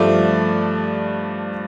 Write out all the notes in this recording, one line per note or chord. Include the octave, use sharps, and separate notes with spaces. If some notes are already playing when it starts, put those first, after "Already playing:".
Already playing: G2 F3 A3 D5